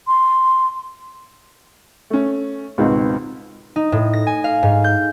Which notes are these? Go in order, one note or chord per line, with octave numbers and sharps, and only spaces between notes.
C6
A3 C#4
C#2 G#2 B2 D#3 B3 C4
D#4
A2
A#6
G#5
F5
G#2
G6